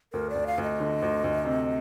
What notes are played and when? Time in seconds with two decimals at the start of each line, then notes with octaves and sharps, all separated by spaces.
0.13 D2 A#4
0.30 D5
0.35 D2
0.47 F5
0.58 D2
0.63 D#5
0.80 D3
1.02 D2
1.24 D2
1.45 C3